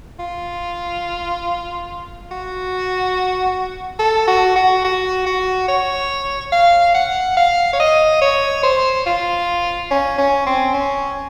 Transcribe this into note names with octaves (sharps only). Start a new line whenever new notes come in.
F4
F#4
A4
F#4
F#4
F#4
F#4
C#5
F5
F#5
F5
C#5
D#5
C#5
C5
F4
C#4
C#4
C4
C#4